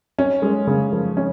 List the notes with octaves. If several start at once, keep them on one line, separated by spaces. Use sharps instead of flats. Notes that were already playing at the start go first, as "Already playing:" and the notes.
C#4
G#3
C#3
F3
C#4